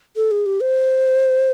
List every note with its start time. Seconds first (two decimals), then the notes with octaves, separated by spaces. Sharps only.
0.16 A4
0.31 G#4
0.46 G4
0.61 C5